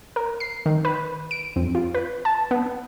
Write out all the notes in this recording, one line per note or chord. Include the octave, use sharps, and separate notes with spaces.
A#4
C7
D#3
B4
D7
F2
F4
B4
A5
B3